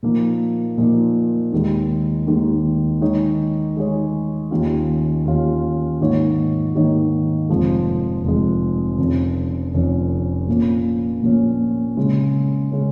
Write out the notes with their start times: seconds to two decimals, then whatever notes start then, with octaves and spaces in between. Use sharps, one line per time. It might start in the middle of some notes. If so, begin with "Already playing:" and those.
0.03 A#2 F3 A#3 D#4
0.78 A#2 F3 A#3 D#4
1.52 D#2 D#3 G#3
2.27 D#2 D#3 G#3
3.01 D#3 G#3 D#4 G#4 C#5
3.76 D#3 G#3 D#4 G#4 C#5
4.51 D#2 D#3 C#4 F4
5.25 D#2 D#3 C#4 F4
6.00 G#2 D#3 A#3 D#4 C#5
6.75 G#2 D#3 A#3 D#4 C#5
7.49 F1 F2 F3 G#3
8.24 F1 F2 F3 G#3
8.98 F1 F2 F3 C#4
9.73 F1 F2 F3 C#4
10.48 A#2 F3 A#3 C#4
11.23 A#2 F3 A#3 C#4
11.97 C#3 G#3 C#4
12.72 C#3 G#3 C#4